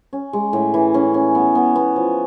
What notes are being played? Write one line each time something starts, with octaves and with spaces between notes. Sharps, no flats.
C#4
G#3
A2
E3
C#4
C#4
B3
B3
B3
F3